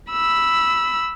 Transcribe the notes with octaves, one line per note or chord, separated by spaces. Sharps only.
B5 E6